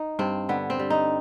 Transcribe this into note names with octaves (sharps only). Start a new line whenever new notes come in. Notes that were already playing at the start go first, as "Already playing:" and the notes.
Already playing: D#4
G2 C4
D3 B3
C4
G3
D#4